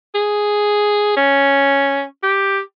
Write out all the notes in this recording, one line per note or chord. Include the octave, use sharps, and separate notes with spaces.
G#4
C#4
G4